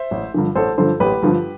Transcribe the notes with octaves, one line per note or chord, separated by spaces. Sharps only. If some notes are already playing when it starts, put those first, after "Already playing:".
Already playing: C5 E5
A1
G2 D3 F3
A1 A4 C5
G2 D3 F3 A4 C5
A1 G4 B4
G2 D3 F3